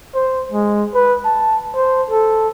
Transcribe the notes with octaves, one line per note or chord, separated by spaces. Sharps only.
C5
G#3
B4
A5
C5
A4